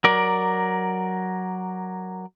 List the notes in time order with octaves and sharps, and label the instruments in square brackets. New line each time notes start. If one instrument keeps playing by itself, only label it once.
[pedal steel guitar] F#3 A#4 D5